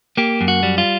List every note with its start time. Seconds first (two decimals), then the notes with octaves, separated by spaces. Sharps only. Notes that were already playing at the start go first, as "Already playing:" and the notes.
0.17 A#3 G4
0.41 F#2
0.48 F#4
0.63 G3
0.78 F4